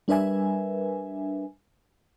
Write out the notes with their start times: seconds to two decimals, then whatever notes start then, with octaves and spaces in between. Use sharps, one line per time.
0.08 G3 D4 A#4 B4 E5 G#5